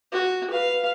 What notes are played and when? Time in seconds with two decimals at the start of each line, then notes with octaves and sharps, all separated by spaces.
0.12 F#4
0.50 B4 F5